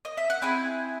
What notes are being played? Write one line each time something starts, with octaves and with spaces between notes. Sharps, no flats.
D#5
E5
F#5
C4 E4 G#4 G#5